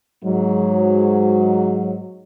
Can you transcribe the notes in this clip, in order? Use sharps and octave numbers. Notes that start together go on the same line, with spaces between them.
G#2 F#3